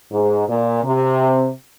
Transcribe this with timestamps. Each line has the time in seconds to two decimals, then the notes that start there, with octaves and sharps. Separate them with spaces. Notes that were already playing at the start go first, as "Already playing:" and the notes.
0.12 G#2
0.48 A#2
0.84 C3